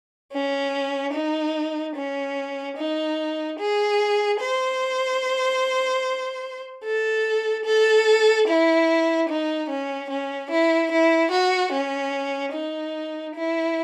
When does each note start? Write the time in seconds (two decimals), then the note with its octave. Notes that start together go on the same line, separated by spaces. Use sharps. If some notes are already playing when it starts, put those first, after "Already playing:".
0.33 C#4
1.14 D#4
1.96 C#4
2.77 D#4
3.58 G#4
4.40 C5
6.84 A4
7.66 A4
8.47 E4
9.29 D#4
9.69 C#4
10.10 C#4
10.51 E4
10.92 E4
11.32 F#4
11.73 C#4
12.54 D#4
13.36 E4